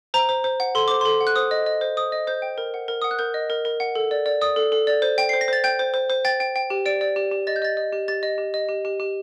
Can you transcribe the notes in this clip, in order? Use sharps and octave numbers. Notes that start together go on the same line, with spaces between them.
C5 A#5
C5
C5
F#5
A4 C6
C5 D6
A4 C6
F#5
F#6
C5 D#6
D#5
D#5
C5
C5 D#6
D#5
C5 G6
G5
A#4
F#5
A#4
F#5 D#6
F#6
A#4 G6
D#5
A#4
A#4
F#5
A4
D5
D5
D5 D#6
A4
A4
D5
C5
G5
C5 C7
A#6
C5 A6
G5 G6
C5
C5
C5
G5 A6
G5
G5
G4
D5 D7
D5
G4
G4
D#5 A6
G6
D#5 A6
D#5
G4
G4 A6
D#5
G4
D#5
G4
G4
G4